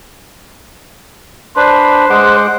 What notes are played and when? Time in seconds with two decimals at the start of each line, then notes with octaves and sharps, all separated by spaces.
1.56 D4 B4 C5
2.10 G#3 F#5 D6